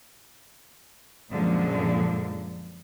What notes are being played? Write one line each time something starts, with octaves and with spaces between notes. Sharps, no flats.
F#2 A#2 D3 F3 G#3